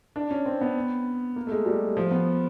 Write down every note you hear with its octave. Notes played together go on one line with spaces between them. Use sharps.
D4
C#4
C4
B3
A#3
A3
G#3
G3
F3
B3